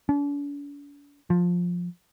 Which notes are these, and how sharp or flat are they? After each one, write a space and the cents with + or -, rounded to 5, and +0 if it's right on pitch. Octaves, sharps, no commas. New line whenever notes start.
D4 -45
F3 +15